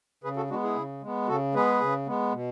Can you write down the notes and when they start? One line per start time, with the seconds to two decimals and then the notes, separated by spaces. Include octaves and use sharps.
0.24 C#3 G#4 B4
0.37 F#4 A4
0.50 G#3 B3 D4 F#4
0.63 E4 G#4
0.76 C#3
1.02 G#3 B3
1.28 C#3 F#4 A4
1.54 G#3 B3 G#4 B4
1.81 C#3
2.07 G#3 B3
2.32 B2